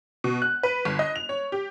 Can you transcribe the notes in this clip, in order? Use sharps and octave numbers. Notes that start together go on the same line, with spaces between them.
B2
F#6
B4
G1
D#5
F7
C#5
G4